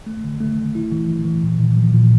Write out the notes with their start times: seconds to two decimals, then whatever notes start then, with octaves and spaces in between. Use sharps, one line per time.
0.06 A3
0.24 D3
0.41 A3
0.58 A3
0.75 E4
0.92 E3
1.09 E3
1.25 E3
1.43 A#2
1.59 A#2
1.77 F3
1.93 A#2